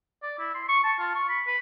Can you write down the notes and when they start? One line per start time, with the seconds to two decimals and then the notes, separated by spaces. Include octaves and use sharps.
0.23 D5
0.39 E4
0.54 C6
0.68 C#6
0.83 A5
0.99 F4
1.15 C#6
1.29 B5
1.47 B4